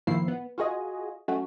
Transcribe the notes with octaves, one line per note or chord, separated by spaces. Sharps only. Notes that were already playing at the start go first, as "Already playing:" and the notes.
A2 D#3 F3 A#3 E4 C7
B3
F4 F#4 G#4 D#5
F#3 A3 C#4 F#4